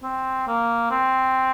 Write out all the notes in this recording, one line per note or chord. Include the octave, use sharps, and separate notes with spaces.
C4
A#3
C4